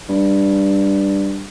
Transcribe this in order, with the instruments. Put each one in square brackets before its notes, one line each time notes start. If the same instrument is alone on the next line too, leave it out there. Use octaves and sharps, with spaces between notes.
[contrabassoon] G2